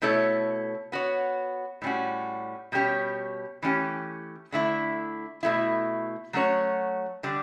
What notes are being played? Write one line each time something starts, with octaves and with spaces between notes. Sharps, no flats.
B2 A3 E4 A4 C#5
B3 F#4 C#5
A2 G3 C#4 F#4
B2 G3 C#4 G4 C#5
E3 A3 C#4 G4
D3 A3 E4
B2 A3 E4
F#3 A3 C#4 F#4 C#5
D3 G3 D4